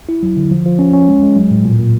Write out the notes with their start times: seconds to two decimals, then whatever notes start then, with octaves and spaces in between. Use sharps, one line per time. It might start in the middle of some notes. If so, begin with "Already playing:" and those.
0.09 E4
0.23 F#3
0.37 D3
0.51 F3
0.66 F3
0.79 C#4
0.93 C#4
1.08 G#3
1.23 G#3
1.36 F#3
1.51 A2
1.65 A#2
1.79 A#2